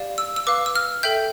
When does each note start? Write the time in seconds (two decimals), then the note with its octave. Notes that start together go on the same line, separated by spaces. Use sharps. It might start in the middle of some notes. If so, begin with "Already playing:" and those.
Already playing: G4 D5 F5
0.18 E6
0.36 E6
0.47 B4 F5 D6
0.66 E6
0.76 F6
1.03 A4 E5 G5 G6